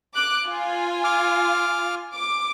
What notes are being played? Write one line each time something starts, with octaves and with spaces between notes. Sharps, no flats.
D6 F#6
F4 G#5
D6 F6
D6